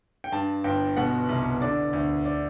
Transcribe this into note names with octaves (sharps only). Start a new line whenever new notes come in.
G5
G2 A5
G1 G5
B2 F#5
C2
D3 D5
D2
D5